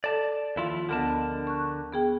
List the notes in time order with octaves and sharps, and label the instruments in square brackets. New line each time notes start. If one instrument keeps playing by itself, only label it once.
[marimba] A4 [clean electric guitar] D5 A5
[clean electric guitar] D#2 E4 F4 [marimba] F3
[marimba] D2 B3 D#5 [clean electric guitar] D3 A#4 A5
[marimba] C#6 F#6
B3 G#4 G5